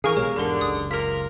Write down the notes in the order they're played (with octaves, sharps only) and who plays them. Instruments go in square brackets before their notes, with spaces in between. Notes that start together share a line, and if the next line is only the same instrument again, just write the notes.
[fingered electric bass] D3 E3 [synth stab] G#4 [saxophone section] A#4 [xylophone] F5 G#5 C#6
[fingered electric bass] B1 B2 G#3 [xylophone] G4 C#5
[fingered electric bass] E2 G#2 [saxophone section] D3 [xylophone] G4 A#4
[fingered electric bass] F#1 C#2 [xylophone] D#6
[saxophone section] C3 F4 A#4 [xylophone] B6